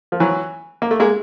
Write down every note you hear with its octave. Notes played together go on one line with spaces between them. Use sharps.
F3
E3 F#3
A#3
A3
G#3 A#3